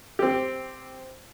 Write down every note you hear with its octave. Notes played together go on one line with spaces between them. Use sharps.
C4 G4